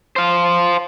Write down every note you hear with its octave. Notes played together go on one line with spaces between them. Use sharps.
C5 F5